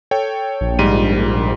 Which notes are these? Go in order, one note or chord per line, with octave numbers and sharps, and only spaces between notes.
A4 C#5 G5
A#1
G#2 G3 D#7